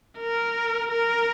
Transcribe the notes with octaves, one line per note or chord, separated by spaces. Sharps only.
A#4
A#4